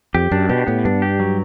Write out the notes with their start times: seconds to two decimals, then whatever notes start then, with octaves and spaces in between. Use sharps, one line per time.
0.15 F2 G4
0.31 F#2 D4
0.49 B2 G4
0.67 A2 B3
0.85 G2 D4
1.02 G4
1.20 F#3